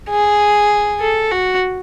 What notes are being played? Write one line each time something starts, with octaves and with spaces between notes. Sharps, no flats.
G#4
A4
F#4